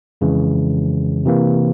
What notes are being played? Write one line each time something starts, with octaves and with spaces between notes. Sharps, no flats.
F2 C#3 E3 G#3
C3 E3 A#3